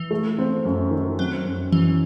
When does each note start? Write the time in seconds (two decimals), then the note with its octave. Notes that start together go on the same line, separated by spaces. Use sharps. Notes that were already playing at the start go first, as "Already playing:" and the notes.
Already playing: E3
0.11 A3
0.38 C4
0.65 F#2
0.91 D#3
1.18 F#3 C4
1.45 F#2
1.72 F#2 E3